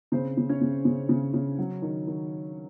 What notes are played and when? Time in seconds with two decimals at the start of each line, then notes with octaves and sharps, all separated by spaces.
0.12 C#3 C4 C5
0.37 C#3
0.49 C#4 C#5
0.61 C#3
0.85 C#3
1.09 C#3
1.34 C#3
1.59 F#3
1.82 D#3
2.07 D#3